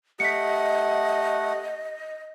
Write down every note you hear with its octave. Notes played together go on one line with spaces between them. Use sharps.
A3 G4 D#5 F#5 B6 C#7